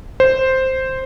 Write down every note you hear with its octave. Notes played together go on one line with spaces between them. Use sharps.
C5